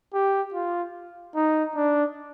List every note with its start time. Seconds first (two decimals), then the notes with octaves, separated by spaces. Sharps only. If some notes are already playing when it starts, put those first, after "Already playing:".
0.14 G4
0.54 F4
1.35 D#4
1.75 D4